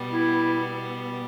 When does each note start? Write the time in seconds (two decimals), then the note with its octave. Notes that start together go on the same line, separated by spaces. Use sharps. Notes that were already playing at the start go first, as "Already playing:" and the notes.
Already playing: B2 G3 B3
0.12 E4